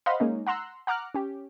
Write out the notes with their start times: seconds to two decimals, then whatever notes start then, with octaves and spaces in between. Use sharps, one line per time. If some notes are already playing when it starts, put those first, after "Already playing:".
0.06 C5 D#5 F5 F#5 B5 C6
0.20 G#3 A#3 C#4 D#4
0.47 F#5 A#5 C6 E6 F#6
0.87 F#5 A#5 D6 F6 F#6
1.14 C#4 G4